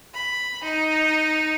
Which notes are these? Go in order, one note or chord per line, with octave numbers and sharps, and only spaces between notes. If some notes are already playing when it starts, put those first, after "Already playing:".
B5
D#4